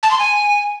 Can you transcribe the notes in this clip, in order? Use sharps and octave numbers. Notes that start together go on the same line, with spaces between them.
A5
C6
G#5